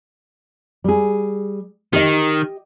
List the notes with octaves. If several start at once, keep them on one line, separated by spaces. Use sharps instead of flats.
G3 G#4
D#3 G4 D#5